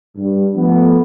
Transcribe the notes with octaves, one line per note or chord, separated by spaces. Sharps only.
G2
F3 A3 B3